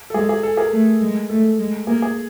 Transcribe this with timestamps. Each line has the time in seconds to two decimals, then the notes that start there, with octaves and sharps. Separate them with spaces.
0.10 A4
0.14 G#3 G#4
0.29 G#4
0.43 A4
0.57 G#4 A#4
0.72 A3
1.02 G#3
1.30 A3 A4
1.59 G#3
1.87 A#3 G#4
2.02 G#4